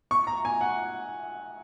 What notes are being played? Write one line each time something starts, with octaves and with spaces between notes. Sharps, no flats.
C#6
A#5
G#5
F#5